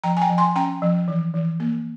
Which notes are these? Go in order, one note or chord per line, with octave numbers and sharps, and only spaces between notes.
F3 G5 A#5
G#5
G5 A#5
F3
G#5 C6
C#4 G5 A#5
F3
E3
E3
A#3